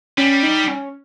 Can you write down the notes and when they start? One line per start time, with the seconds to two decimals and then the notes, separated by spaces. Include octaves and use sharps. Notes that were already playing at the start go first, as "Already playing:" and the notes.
0.18 G3 C#4
0.43 D#4
0.68 C#4